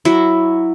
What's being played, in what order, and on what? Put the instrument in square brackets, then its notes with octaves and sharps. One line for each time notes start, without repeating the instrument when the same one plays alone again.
[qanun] F#3 E4